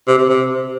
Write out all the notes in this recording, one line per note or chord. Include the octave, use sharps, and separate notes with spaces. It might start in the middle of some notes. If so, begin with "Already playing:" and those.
C3
C3
C3